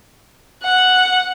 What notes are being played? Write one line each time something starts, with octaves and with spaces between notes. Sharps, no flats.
F#5